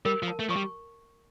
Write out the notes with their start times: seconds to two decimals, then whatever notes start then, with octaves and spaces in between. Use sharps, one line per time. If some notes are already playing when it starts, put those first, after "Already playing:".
0.05 G3 A#4
0.23 F3
0.28 A5
0.39 A3
0.49 F3 C#6
0.56 G3